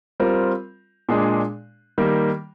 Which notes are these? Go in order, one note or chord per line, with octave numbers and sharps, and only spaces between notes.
G3 C4 F4 A#4
A#2 G#3 D4 G#4
D#3 G3 A#3